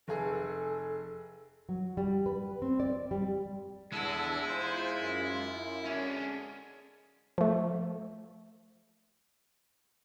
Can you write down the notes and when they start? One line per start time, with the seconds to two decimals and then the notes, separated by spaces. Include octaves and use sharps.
0.08 F1 G#4 A4
1.69 F#3
1.97 G3
2.26 B4
2.62 C4
2.80 D5
3.11 G3
3.92 E2 D3 G#3 E4 A4
4.48 D#4 F4 C5
4.97 F#2
5.85 D3 G#3 C#4 D4
7.38 F3 A3